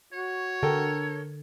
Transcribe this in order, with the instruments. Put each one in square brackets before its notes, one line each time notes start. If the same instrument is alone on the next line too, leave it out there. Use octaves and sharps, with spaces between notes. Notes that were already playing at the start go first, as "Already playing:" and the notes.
[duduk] F#4 [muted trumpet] C#5
[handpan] D3 [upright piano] A4 A#4 G5